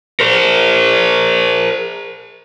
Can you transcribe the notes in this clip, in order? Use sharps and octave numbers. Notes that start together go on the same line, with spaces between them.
A#4 C5